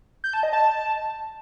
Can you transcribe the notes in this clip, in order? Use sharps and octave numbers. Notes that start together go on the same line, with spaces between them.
G6
A5
D#5
A5